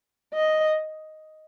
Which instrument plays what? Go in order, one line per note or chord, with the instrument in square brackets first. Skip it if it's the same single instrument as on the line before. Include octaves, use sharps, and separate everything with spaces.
[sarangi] D#5